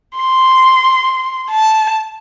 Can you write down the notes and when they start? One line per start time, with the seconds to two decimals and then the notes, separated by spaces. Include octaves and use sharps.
0.18 C6
1.51 A5